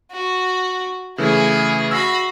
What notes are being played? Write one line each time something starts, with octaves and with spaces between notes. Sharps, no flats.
F#4
C#3 E3 A3 E4 G#4
F#4 B5 E6 A#6 C7